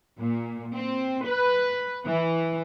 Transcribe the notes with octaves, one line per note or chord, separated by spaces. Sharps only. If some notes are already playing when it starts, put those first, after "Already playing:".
A#2
C4
B4
E3